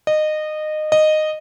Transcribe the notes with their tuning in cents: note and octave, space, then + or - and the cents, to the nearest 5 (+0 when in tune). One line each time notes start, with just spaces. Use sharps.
D#5 -20
D#5 -10